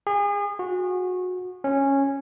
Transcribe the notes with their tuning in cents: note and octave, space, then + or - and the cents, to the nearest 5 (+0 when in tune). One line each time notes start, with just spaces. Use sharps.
G#4 -35
F#4 -25
C#4 -10